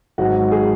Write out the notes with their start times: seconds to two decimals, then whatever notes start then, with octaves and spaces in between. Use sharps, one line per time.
0.18 G#1 G#2 F#3 F#4
0.51 G#4